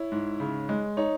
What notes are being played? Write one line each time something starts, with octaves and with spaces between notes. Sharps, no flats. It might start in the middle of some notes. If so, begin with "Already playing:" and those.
Already playing: E4 C#5
G#2
C#3
G#3
D#4 C#5